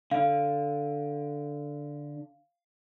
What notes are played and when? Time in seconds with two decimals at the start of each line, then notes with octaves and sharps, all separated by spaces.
0.11 D3 F5